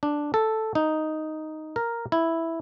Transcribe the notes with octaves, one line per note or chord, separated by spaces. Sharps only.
D4
A4
D#4
A#4
E4